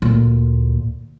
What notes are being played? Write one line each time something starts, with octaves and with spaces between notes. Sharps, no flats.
D2 A#2